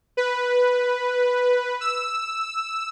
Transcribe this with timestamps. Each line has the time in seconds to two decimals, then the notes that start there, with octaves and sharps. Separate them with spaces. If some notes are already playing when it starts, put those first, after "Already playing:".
0.17 B4
1.81 E6